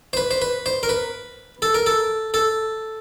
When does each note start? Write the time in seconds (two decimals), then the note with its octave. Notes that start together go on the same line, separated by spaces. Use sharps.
0.13 C5
0.17 B4
0.31 C5
0.42 B4
0.66 C5
0.83 A#4
0.89 B4
1.62 A4
1.74 A#4
1.86 A4
2.34 A4